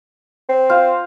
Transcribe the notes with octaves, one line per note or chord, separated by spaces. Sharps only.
C4
F4 C5 F5